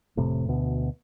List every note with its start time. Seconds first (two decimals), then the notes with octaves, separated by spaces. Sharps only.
0.17 F1 A2 C3
0.48 D2 B2